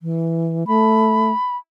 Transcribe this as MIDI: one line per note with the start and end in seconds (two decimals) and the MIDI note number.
0.02 0.64 52
0.67 1.32 57
0.67 1.57 83